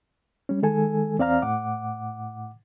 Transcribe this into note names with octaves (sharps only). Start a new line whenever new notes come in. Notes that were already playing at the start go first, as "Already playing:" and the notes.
G3 C#4
D#3 G#3 A4 G#5
E2 C4 D5 F5 A#5 F6
A2 F#5 D6